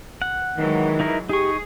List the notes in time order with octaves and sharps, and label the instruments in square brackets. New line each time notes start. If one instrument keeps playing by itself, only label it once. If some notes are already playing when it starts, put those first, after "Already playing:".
[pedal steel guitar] F#5
[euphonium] D#3 [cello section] E3 F#3 G#3
[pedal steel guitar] D#4 E4 A#4
[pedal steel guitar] D#4 C#6 [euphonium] G4 [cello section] G#4